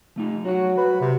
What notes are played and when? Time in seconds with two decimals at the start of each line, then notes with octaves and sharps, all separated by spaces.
0.16 F3 A3 D#4
0.45 F#3 F#4 F#5
0.78 B4
1.01 C3